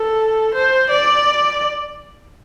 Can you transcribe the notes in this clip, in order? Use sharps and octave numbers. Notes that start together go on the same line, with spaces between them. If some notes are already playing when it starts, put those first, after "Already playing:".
Already playing: A4
C5
D5